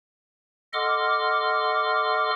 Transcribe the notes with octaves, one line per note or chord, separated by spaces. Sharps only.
A4 D#5 F#5 C6 D6 F6